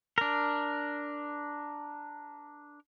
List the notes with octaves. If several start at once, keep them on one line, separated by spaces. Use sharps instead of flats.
D4 A#4